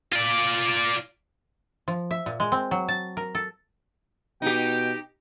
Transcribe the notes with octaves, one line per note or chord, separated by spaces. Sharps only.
F4 D5
F3
E5
A#2
G#3
C4
F#3
A5
A#4
A4
B2 D#4 G4 G5